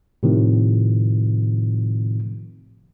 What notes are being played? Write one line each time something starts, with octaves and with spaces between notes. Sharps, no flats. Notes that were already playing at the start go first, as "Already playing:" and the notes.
A2 C3 D#3 F3